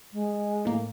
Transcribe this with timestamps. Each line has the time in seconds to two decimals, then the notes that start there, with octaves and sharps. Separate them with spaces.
0.13 G#3
0.65 A2 A#3